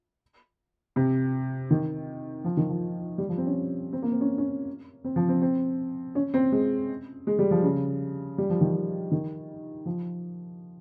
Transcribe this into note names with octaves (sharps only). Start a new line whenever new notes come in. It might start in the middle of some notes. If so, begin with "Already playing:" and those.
C3
D#3
F3
D#3
F3
G3
F3
C4
C#4
C4
A#3
C4
C#4
C#4
C4
F3
C4
C4
C#4
C4
G#3
G#3
G3
F3
C#3
G3
F3
D#3
F3
D#3
F3